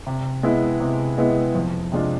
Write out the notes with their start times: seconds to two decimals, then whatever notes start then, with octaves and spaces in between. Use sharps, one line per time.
0.07 C3
0.43 G#3 B3 E4
0.80 C3
1.18 G#3 B3 E4
1.55 F2
1.92 C3 G#3 D4 F4